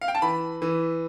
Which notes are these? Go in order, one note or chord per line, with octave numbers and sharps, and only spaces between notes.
F5
G5
A5
E3 B5
E3